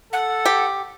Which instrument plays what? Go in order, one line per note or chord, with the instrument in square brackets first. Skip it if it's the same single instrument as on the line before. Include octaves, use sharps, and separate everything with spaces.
[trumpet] A4 [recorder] F#5
[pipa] G4